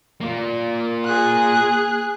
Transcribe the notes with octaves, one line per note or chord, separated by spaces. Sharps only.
A#3 F4
G#4 F#6